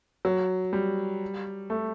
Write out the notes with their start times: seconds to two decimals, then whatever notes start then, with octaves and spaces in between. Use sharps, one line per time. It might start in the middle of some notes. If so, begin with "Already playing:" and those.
0.25 F#3
0.73 G3
1.70 A3